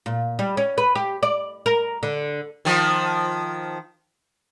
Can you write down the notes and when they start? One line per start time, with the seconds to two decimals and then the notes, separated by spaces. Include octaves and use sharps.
0.06 A#2
0.39 G3
0.57 C#4
0.78 B4
0.95 G4
1.23 D5
1.66 A#4
2.03 D3
2.65 D#3 F3